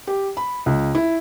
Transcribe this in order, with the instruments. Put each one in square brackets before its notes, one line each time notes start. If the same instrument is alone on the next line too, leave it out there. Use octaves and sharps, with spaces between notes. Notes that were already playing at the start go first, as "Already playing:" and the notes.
[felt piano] G4
B5
C#2
E4